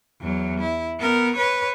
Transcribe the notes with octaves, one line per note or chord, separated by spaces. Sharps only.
E2 F#3
E4
B3 A#4
B4 C#5